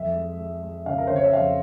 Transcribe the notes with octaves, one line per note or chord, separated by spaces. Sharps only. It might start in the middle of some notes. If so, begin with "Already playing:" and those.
Already playing: F2 E5
G#3
G#3
G#3
C#3 F5
A#4
C#3 C5
C#5
E5
F2 F5